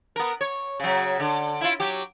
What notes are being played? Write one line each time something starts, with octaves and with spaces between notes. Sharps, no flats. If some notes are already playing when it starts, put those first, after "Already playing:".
B3 A#4
C#5
C#3 F#3
D3
E4 F4
F#3 G4